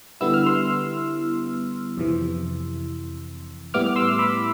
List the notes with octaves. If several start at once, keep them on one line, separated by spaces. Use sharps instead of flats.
D3 G3 B3 E4 E6
F6
C6 E6
F2 C3 E3
A2 G3 B3 E4 D6 F6
F6
C6 E6
B5 D6